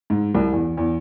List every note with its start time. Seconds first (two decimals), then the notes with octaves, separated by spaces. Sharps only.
0.10 G#2
0.35 C2
0.53 E2
0.77 E2